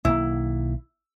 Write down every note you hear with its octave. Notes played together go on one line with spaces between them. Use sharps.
B1 D#3 A#3 E4